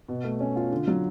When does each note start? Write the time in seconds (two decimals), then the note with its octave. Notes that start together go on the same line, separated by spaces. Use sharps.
0.08 B2
0.24 A3
0.40 C#4
0.56 F4
0.72 D3
0.87 F#3